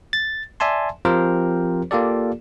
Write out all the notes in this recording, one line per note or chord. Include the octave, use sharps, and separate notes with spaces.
A6
D5 E5 G#5 A5 C6
F3 C4 F4 G4 A#4 C5
A#3 F4 G4 A4 D5